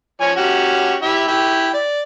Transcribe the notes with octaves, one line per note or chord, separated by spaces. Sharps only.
F3 C#5 G#5
C#4 F#4 G4
E4 G4 E5
E4 G4 G5
D5